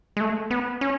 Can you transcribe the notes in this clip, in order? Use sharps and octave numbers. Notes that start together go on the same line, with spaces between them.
G#3
A3
B3
C#4